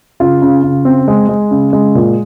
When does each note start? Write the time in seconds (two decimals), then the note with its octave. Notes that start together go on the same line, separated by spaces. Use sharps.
0.20 C#3 F4
0.42 C#3
0.64 C#3
0.85 C4
1.08 G#3
1.29 G#3
1.51 C#3
1.73 G#3
1.95 A#2